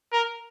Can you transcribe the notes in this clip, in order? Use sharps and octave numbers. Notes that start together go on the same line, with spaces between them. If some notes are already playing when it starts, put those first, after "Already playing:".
A#4